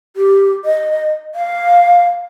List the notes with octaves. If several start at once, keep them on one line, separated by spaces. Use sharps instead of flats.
G4
D#5
F5